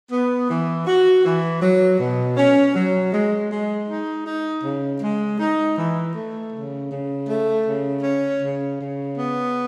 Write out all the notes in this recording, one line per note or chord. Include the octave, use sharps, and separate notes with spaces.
B3
E3
F#4
E3
F#3
B2
C#4
F#3
G#3
G#3
D#4
D#4
C#3
G#3
D#4
E3
A3
C#3
C#3
A3
C#3
C#4
C#3
C#3
B3